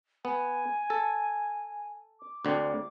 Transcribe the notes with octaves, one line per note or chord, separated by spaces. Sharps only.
B3 G#5
A4
D6
D2 D3 C4